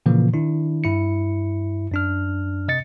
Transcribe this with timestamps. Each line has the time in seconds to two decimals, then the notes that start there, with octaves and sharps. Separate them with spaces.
0.06 A#2 C#3 E3 F3 A#3
0.33 D#3 D4 E4
0.84 G2 E4 C#7
1.92 F#2 D4 F6
2.68 C3 D#5 A6 C#7